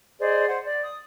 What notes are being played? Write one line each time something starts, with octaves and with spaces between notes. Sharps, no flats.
G#4 C5 D5 D#5
C5 F#5
D5
D#6